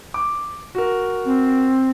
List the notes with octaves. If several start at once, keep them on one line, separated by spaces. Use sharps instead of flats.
D6
F#4 A#4
C4